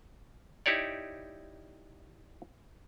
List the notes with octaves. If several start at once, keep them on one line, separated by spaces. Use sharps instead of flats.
D#4 E4 G4 C#5 D5